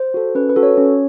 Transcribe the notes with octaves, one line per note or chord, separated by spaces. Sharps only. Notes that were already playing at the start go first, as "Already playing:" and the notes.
Already playing: C5
F#4 A4
C#4 B4
B4
F#4 A4
C#5
C#4